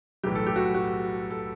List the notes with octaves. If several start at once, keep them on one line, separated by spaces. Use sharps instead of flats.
B1 A2 E3 G3 G4
A4
G4
F#4
F#4
A4